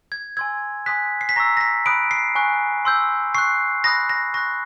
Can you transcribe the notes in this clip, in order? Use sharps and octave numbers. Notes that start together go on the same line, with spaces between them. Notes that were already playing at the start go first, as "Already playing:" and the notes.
G#6
G#5 C6 E6 G#6
G#5 C6 D#6 F#6 B6
C7
B6
A#5 C#6 E6 A#6
A#6
B6
B5 D#6 F#6 D7
C7
G#5 C#6 F#6
C6 E6 G6
C#6 F#6 C7
B5 D#6 F#6 A#6
A#6
C#6 F#6 A#6